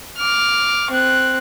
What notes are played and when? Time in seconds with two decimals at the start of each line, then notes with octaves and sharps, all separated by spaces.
0.17 D6 F6
0.91 C4 F#6